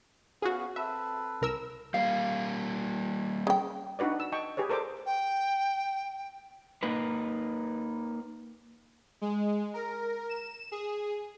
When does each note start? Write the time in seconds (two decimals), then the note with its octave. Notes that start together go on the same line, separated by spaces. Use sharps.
0.42 B3 C#4 F#4 G#4 F5
0.76 C4 A4 B4 E5
1.42 C2 A#4 E6
1.94 G3 A#3 F5
3.47 C#3 G5
3.99 D4 D#4 F#4 B4 D5
4.20 E6
4.32 D#5 G5 A5 C#6
4.57 G4 G#4 B4 C#5
4.69 A4 A#4 C5 D5 D6
5.06 G5
6.83 A#3 D#4 B4
9.21 G#3
9.74 A#4
10.29 E7
10.72 G#4